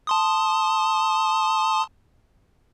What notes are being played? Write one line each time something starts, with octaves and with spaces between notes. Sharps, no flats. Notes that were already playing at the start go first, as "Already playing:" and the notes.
A5 C6 D#6